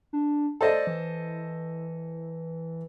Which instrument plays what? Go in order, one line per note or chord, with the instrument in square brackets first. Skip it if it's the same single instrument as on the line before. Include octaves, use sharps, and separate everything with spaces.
[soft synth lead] D4
[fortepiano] A4 C5 D#5 [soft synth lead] D5
[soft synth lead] E3